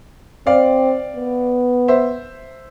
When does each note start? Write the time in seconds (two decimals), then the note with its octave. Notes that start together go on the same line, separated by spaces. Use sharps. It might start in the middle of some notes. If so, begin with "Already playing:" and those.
0.47 C4 D5 F5
1.17 B3
1.88 C5 E5